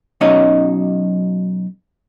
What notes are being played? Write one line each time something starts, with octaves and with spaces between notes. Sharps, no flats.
B1 F#3 C#4 D#4 C#5 D#5